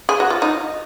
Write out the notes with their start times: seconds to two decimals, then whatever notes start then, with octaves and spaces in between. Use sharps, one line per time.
0.09 G#4
0.20 F#4
0.30 F4
0.42 D#4